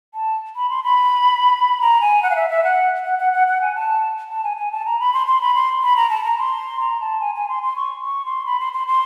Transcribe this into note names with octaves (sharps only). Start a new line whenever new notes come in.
A5
B5
C6
B5
A#5
G#5
F#5
F5
E5
E5
F#5
F#5
F#5
F#5
F#5
G#5
A5
A5
G#5
G#5
A5
A#5
B5
C6
C6
B5
C6
B5
A#5
A5
A#5
C6
A#5
A5
G#5
G#5
C6
C6
C#6
C#6
C6
B5
C6
C6
C6